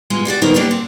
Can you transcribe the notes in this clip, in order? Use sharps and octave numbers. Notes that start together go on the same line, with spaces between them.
G#3 B3 F4
G3 E4 F#4 D5
D3 F#3 B3 D#4 A#4 C5
G3 A#3 C#4 D4 F#4 G4
C4